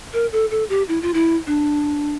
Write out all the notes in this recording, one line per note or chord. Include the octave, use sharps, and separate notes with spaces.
A#4
A4
A4
G4
E4
F4
E4
D4